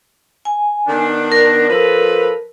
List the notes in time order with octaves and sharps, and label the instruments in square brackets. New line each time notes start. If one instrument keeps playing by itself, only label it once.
[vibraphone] G#5
[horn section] D#3 B3 D4
[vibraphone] A#4
[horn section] F3 A4 B4